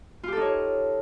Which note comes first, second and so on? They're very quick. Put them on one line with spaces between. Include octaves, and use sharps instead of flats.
F4 G4 A4 D#4 C#5